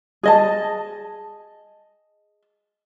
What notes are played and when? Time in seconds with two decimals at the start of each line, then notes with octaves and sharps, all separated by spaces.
0.23 G#4 D#5 A5